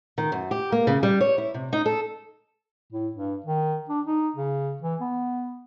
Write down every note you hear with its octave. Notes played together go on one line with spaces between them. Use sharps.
D#3
F#2
G4
A#3
C#3
G3
C#5
E4
C3
D#4
A4
A2
G2
D#3
D4
D#4
C#3
E3
B3